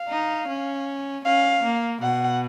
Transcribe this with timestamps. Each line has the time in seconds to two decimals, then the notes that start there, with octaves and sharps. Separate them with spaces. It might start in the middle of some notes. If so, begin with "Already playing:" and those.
Already playing: F5
0.09 D#4
0.48 C#4
1.25 C#4 F5
1.63 A#3
2.02 B2 F#5